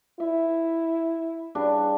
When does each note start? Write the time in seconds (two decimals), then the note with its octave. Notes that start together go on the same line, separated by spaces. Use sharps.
0.20 E4 E5
1.55 C#3 G3 D4